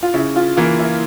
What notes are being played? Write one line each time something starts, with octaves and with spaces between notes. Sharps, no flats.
F4
C#3 E4
F4
E3 A#3 F4
E4